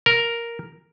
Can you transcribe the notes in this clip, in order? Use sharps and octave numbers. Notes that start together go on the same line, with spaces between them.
A#4